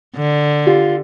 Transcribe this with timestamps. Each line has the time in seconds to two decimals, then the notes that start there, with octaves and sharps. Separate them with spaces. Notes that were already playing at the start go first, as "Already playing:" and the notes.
0.16 D3
0.67 F4 G4